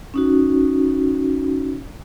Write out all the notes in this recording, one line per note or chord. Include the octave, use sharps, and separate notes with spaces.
C#4 D#4 F#4